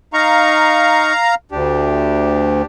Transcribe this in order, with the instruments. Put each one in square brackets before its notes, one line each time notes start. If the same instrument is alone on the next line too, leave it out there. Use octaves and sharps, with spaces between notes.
[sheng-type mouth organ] D#4 C#6 [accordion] F5 A#5
[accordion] D2 [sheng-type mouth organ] D4 G4